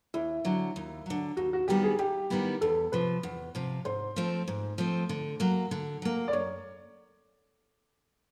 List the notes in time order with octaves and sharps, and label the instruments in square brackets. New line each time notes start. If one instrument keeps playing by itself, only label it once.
[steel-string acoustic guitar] D#2 [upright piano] E4
[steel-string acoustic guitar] D3 F#3
D#2
D3 F#3
[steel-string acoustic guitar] D#2 [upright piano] F#4
[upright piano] F#4
[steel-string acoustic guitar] D#3 G3 B3 E4 [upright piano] G4
[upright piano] G#4
[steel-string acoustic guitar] D#2 [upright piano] G4
[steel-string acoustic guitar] D#3 G3 B3 E4
[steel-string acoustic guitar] E2 [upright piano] A4
[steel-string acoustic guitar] C3 F3 [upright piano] B4
[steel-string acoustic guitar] E2
C3 F3
[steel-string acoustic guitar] G#2 [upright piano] C5
[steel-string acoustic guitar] F3 A3 C4
G#2
F3 A3 C4
D3
F#3 A#3
D3
F#3 A#3
[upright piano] D5
[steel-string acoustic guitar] F#2 [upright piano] C#5